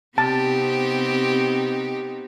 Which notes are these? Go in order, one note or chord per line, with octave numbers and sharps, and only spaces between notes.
C3 B3 C4 D#4 G4 A5